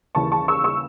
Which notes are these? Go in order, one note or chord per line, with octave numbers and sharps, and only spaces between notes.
D#2 C#3 E3 A5 C#6
A5 C#6
C#6 E6
C#6 E6